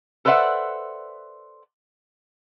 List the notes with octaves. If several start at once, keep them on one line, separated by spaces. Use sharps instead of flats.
A4 B4 C5 D5 E5 F#5